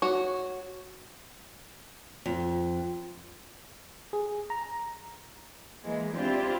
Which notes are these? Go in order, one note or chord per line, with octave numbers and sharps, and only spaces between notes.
F#4 C#5
F2
G#4
A#5
E3 G#3 A#3
C4 D4 E4 F4 G4